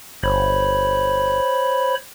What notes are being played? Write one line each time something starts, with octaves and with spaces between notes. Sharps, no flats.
G1 C5 C#5 B5